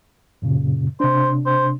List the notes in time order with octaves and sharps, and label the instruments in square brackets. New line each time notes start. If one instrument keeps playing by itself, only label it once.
[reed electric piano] F#2 A#2 C#3
[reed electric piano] C3 D4 [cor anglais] C5
[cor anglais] C5